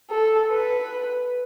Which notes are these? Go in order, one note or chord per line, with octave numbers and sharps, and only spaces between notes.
A4
B4